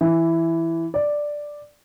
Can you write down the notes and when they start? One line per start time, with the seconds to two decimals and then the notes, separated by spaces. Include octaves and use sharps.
0.01 E3
0.94 D5